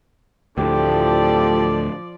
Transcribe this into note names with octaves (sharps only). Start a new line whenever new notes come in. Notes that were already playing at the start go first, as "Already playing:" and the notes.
D2 A2 F3 G4 A4 D5